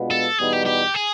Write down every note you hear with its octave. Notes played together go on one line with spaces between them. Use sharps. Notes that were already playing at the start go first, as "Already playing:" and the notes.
Already playing: B2 G#3 B3 D4 F4
A4
E2 B2 G3 B3 D#4 G#4
G4
G4
G#4